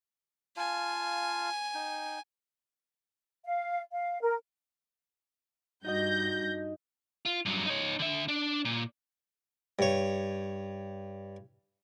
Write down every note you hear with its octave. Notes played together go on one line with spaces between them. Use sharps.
F4 F5 G#5 A5
D#4 G5
F5
F5
A#4
G2 D#4 F#4 D#5 G6 A#6
F4
G2 F#3
D#4 C#5
D3 E5
D4
A#2
G2 C#5